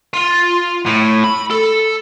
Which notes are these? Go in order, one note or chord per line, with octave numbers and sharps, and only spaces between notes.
F4
A2
B5
A4